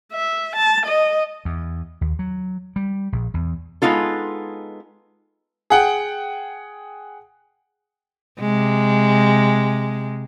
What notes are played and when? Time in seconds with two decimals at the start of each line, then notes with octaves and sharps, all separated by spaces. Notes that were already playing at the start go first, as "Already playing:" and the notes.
0.12 E5
0.56 A5
0.86 D#5
1.45 E2
2.01 D#2
2.19 F#3
2.76 G3
3.12 A#1
3.34 E2
3.82 G#3 B3 D#4 F4 A4
5.70 G#4 F#5 G5
8.40 C3 G#3